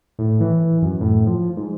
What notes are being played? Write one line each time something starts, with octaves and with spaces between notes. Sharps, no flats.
A2
E3
F#2
A2
F3
G#2